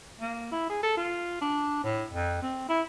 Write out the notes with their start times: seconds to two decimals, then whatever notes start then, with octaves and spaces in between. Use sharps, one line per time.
0.20 A#3
0.52 E4
0.69 G#4
0.83 A4
0.97 F4
1.41 D4
1.83 A2
2.10 F2
2.42 C4
2.69 E4